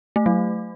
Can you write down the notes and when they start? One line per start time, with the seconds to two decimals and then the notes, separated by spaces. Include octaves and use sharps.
0.16 A3
0.26 F#3